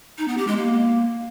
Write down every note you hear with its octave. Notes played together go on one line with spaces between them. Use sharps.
D#4
B3
G4
G#3
A#3